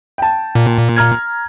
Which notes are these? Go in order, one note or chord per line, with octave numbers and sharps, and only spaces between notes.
G5 A5
A#2
A#5 F6 G#6